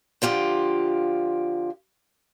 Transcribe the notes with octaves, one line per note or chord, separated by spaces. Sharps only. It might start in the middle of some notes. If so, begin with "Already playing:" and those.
D3 F3 F4 G4